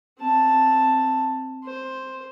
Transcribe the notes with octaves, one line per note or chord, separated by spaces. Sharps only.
C4 A5
C5